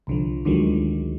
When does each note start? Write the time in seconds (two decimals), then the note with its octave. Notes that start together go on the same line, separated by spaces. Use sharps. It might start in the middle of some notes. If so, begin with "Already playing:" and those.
0.07 C2 D3 F3
0.45 D2 D3 D#3 F3 F#3 G#3